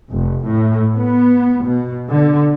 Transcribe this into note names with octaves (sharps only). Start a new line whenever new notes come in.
F1
A2
B3
B2
D3